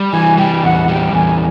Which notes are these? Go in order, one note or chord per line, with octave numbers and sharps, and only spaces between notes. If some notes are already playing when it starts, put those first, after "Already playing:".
Already playing: G3
E3 G#5
G3 G5
E2 F#5
G3 G5
E2 G#5